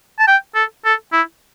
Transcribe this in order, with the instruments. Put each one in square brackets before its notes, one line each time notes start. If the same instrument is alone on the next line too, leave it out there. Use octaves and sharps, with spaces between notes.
[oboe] A5
G5
A4
A4
E4